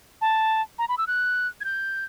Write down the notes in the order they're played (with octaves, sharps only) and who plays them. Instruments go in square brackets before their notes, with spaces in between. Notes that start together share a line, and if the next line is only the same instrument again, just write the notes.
[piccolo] A5
A#5
B5
E6
F#6
G#6
G6